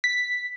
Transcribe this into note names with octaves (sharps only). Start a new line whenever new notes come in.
B6